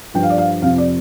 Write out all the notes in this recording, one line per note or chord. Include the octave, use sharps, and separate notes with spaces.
G2 F3 G5
F5
D5
F5
F2 C3 F3 F5
D5